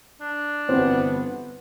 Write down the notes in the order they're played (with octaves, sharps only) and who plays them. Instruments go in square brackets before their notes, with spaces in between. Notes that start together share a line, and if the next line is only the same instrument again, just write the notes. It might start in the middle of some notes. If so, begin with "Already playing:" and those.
[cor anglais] D4
[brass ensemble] G1 E3 B3 [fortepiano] C4